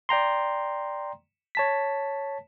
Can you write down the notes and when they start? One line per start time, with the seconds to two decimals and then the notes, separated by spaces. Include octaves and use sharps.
0.09 D5 G5 A#5 C6
1.55 C#5 A5 B6